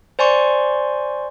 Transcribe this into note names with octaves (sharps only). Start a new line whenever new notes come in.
C5 D5 G#5 C6 C#6